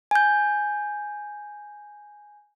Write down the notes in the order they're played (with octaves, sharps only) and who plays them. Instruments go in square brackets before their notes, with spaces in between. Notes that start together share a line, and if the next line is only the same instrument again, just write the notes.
[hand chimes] G#5 G6